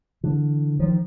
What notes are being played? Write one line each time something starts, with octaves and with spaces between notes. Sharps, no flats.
D3 E3
D#3 F3